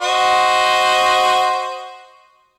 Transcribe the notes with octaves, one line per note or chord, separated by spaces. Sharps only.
F#4 C5 D#5